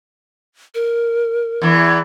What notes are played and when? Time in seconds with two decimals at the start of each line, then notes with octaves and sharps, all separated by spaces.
0.75 A#4
1.62 E2 E3